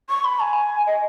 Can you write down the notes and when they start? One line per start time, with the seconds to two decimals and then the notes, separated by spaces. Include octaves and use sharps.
0.09 C#6
0.24 B5
0.40 G#5
0.87 D#5